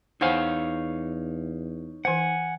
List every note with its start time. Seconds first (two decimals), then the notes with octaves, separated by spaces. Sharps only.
0.21 E2 D#4 C5 C#5 F5 F#5 G#5
2.05 E3 C5 F#5 G#5